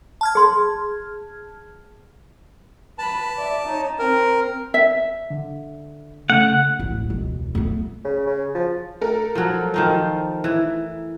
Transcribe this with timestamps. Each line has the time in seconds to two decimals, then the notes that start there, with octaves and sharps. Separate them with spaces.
0.21 A5 F6 G#6
0.35 G#4 C6
2.98 B4 A5 B5
3.36 D5 E5
3.66 D#4 C#5
3.99 C4 A#4
4.74 E5
5.30 D3
6.30 C#3 A3 F#5
6.79 D1 A1
7.10 E1 C#2
7.55 A3 B3
8.05 C#3
8.27 C#3
8.55 F3
9.01 A3 A4 A#4
9.35 F3 F#3
9.74 D#3 F3 D#4
10.44 E3 E4